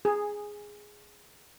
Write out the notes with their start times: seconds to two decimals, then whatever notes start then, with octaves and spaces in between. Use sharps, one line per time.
0.05 G#4